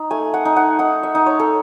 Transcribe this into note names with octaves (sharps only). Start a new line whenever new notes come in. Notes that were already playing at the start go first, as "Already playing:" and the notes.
Already playing: D#4
A3 G#5
F#5
D#4
F#5
D#4 F#5
E5
D#4
C#5
A4